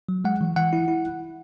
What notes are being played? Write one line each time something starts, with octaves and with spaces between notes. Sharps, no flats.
F#3
G#3 F#5
E3
E3 F#5
E4
E4